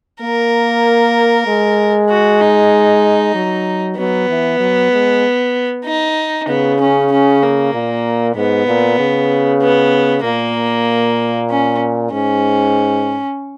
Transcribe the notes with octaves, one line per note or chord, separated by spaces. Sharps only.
A#3 A#4
G#3
F#4
D#4
F#3
F#3 B3
E3
F#3
G#3
D#4
C#3 B3
C#4
C#4
A#3
A#2
G#2 B3
A#2
C#3
B3
A#2 A#3
C#4
G#2 C#4